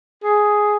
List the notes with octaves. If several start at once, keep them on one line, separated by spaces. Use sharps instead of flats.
G#4